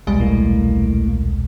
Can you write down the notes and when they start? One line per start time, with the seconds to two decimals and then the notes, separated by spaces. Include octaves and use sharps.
0.07 D#1 B1 G3 G#3
0.19 A2 A#3